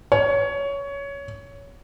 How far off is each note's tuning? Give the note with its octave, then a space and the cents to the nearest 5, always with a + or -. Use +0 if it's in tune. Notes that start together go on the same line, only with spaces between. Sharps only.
C#5 +15